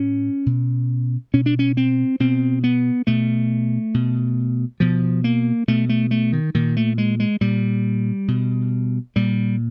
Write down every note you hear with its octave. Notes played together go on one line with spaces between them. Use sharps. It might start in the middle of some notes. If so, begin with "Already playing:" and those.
Already playing: A2 C#4
B2
B2 C#4
D4
C#4
C4
B2 C4
B3
B2 A3
B2
B2 F3
A#3
B2 A3
A3
A3
D#3
A#2 D#3
A3
G#3
G#3
A#2 G3
B2
A#2 G3